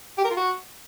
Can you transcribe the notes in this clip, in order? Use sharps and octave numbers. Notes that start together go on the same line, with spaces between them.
G4
A#4
F4
F#4